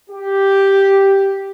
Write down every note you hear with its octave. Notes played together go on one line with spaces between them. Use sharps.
G4